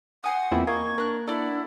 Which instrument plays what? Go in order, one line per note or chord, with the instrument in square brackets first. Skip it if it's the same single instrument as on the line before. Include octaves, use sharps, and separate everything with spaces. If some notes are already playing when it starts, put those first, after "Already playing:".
[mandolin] C5 G#5 D#6 [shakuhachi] F#5
[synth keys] E2 A#2 E4 [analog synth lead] C4
[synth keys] A#3 [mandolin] D#5 [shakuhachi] C#6 [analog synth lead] G#6
[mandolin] D4 F#6 [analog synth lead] A#4
[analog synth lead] D4 [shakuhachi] E4 [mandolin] A4 D5 F#5